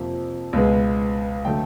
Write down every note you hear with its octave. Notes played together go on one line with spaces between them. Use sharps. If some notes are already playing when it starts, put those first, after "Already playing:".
Already playing: F2 C3 F3 A#3
C#2 B2 G#3 B3
D3 F#3 A3 G5